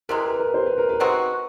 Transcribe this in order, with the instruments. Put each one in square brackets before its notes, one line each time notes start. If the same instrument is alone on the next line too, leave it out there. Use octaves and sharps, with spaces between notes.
[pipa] C3 E3 G#3 [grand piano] A#4
[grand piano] B4
A#4
C5
B4
A#4
B4
[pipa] G#3 C4 D#4 F#4